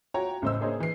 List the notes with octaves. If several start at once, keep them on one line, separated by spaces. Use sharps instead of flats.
F4 F#4 C#5 G5 A#5
A1 C#3 A3 C5 D#5 E6
A#3 D4 G#4 C5 C#5 D#5
E3 C7